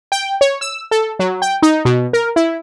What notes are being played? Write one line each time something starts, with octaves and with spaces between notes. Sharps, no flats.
G5
C#5
E6
A4
F#3
G5
D#4
B2
A#4
E4